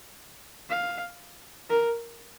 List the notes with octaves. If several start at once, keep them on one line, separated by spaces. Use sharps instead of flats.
F5
A#4